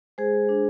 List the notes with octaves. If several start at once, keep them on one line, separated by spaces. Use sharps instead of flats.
G#3 G#4 C5
D4